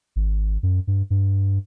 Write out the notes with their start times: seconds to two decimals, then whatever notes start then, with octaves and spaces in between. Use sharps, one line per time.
0.16 G#1
0.63 F#2
0.87 G2
1.10 G2